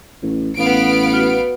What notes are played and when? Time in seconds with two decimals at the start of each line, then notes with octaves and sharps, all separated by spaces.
0.22 A1
0.57 A1 B3 F5 D7
1.13 F#4 B4 F6